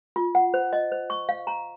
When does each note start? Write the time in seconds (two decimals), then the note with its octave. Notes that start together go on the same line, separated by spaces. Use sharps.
0.16 F4
0.35 F#5
0.54 C5
0.73 D#5
0.92 C5
1.10 C#6
1.29 F5
1.47 A#5